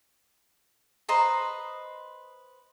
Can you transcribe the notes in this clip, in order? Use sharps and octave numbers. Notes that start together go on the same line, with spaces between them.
B4 C5 D#5 A#5